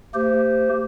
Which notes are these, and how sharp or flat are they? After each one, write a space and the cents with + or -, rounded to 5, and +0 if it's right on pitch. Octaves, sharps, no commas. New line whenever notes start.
A3 +35 G4 +0 C5 -15